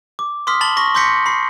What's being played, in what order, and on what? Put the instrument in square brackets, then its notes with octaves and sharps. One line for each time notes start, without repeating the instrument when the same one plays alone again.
[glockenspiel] D6
C6 D6 D#6 F6 B6
A5 B5 A6 F#7 G7
C#6 A#6
C6 D6 G6 A#6 B6 C#7
B5 C7